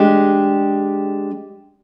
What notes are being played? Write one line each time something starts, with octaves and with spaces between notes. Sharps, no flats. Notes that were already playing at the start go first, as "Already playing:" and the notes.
Already playing: G#3 D4 G4